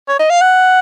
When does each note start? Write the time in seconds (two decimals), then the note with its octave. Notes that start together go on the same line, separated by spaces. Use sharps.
0.08 C#5
0.19 D#5
0.30 F5
0.41 F#5